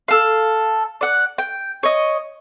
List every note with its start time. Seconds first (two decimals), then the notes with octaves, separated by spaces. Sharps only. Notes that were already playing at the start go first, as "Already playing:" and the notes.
0.08 A4 F5
1.01 D5 F#5
1.38 G5
1.83 C#5 D#5